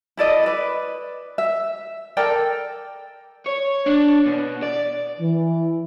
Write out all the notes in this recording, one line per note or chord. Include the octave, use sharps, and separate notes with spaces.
E4 A4 D5 D#5
B4 D5
E5
A4 A#4 D5 G5
C#5
D4
B2
D5
E3